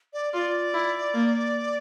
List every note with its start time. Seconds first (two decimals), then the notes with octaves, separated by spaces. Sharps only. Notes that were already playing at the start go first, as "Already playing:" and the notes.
0.13 D5
0.33 F4 D5
0.74 E4
1.14 A#3